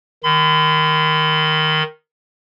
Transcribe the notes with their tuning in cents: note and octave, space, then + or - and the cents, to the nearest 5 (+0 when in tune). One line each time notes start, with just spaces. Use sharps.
D#3 +0 B5 +45